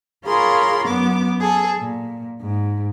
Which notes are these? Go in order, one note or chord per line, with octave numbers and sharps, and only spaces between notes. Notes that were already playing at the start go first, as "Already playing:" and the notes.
F4 G#4 A#4 C#5 B5 C6
F#2 B3 D6
G#4 A4
A#2
G#2